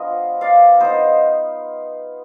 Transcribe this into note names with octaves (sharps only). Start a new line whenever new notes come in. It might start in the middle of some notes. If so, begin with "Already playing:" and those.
Already playing: F3 B3 D4 F4 D#5
D5 F5
B3 D#4 C5 D#5